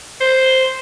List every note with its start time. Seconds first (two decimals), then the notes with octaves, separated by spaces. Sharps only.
0.20 C5